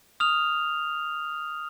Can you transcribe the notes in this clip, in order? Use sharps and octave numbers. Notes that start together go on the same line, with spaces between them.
D#6 F6 F7